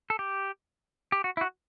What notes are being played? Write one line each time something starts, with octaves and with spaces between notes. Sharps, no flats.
A4
G4
G4
F#4
E4
F#4